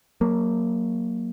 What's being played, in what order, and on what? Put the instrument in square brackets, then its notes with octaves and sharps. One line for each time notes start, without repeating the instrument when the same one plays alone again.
[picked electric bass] F#3 A#3